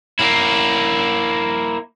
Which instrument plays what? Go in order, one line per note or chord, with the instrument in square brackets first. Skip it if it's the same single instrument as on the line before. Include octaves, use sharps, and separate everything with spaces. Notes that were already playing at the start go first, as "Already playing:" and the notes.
[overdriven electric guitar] A#3 E4